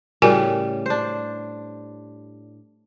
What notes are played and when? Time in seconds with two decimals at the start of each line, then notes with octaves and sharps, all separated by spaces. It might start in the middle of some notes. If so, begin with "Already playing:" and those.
0.22 A2 C#3 G3 F#4 A#4 G#5
0.86 D4 C5